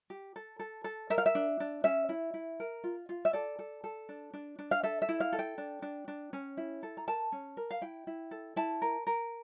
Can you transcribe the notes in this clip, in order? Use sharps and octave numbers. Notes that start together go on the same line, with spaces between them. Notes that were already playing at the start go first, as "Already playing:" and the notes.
G4
A4
A4
A4
A#4 E5
F5
E5
D4
D4
C#4 E5
E4
E4
A#4
F4
F4
E5
A4 D5
A4
A4
D4
D4
D4
F5
A4 E5
E5
E4
F5
A4
G5
D4
D4
D4
C#4
E4
A4
A#5
A#4 A5
C#4
A#4
F5
E4 G5
E4
A4
E4 A5
A#4
A#4